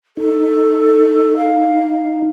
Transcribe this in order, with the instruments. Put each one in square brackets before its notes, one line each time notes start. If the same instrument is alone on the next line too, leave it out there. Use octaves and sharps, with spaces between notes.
[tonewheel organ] D#4 [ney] A4
[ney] F5